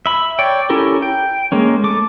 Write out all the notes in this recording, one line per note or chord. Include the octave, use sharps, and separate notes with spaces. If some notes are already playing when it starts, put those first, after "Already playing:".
E5 B5
C#5 D5 G5
C#4 E4 G4 A4 A#4
G5
G#3 A#3 C#4
A3 D6